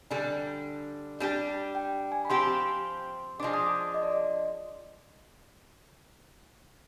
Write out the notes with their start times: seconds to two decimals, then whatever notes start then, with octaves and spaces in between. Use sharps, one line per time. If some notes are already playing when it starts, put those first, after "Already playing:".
0.11 D3 G3 D4 G#5
1.20 G3 D4 G4
1.75 G5
2.12 G#5
2.25 B5
2.30 F3 C4 G4 C6
3.40 F3 G#3 D4 D6
3.54 D#6
3.66 D6
3.94 D#5
4.03 D5
4.12 D#5